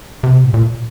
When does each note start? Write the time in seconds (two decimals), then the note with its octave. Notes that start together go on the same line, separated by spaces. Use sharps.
0.23 C3
0.44 A2
0.54 A#2